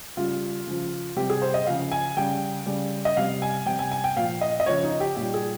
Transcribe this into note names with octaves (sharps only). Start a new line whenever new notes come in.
C#3 G3 F4
C#3 F3
C3 G3 G4
G#4
C5
D#5
C#3 F3 F5
G#5
C#3 G3 G5
C#3 G3
D#5
C3 G3 F5
G#5
C3 G3 G5
G#5
G#5
G5
A#2 F3 F5
D#5
D#5
C#3 F3 C#5
D#4
G4
A#2 G3 G4
G#4